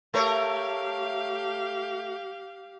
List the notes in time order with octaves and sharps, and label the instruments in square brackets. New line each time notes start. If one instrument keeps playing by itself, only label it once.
[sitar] A3 A#4 C#5 [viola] G4 F5